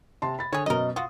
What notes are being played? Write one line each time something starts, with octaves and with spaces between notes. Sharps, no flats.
C3 A5 C6
B5 A6
D3 G#4 C#5
F#2 B2 A#4 D#5
F4 F#4 D#6